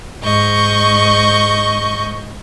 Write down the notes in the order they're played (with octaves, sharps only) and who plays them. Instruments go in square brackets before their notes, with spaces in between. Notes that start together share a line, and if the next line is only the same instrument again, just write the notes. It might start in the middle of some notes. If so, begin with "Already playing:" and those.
[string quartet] G#2 D#5 C#6 G6